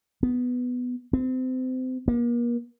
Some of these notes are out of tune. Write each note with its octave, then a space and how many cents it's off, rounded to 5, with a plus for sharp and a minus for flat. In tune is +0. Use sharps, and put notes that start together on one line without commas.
B3 +5
C4 -30
A#3 +40